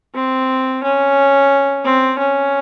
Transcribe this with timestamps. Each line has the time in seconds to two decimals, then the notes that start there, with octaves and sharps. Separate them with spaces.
0.15 C4
0.84 C#4
1.85 C4
2.18 C#4